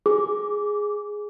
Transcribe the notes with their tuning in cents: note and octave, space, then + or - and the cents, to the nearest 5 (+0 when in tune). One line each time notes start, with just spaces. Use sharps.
G#4 +0 D6 -20